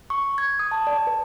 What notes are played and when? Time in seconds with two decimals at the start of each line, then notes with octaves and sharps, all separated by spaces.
0.10 C#6
0.38 G#6
0.59 D#6
0.71 A5
0.87 D5
1.07 B4